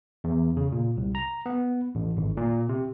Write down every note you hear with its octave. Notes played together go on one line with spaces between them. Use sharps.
E2
C#3
A#2
C2
A#5
B3
A1
G#1
A#2
C3